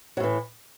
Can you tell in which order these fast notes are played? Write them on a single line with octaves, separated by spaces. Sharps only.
F#3 A2 E3